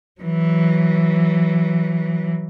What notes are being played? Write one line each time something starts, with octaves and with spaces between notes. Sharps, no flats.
E3 F#3